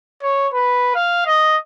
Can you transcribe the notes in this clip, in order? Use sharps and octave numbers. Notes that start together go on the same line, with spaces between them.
C#5
B4
F5
D#5